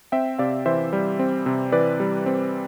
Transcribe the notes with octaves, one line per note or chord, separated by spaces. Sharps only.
C4 E5 G5
C3 D5 F5
E3 C5 E5
G3
C4
C3
E3 B4 D5
G3
C4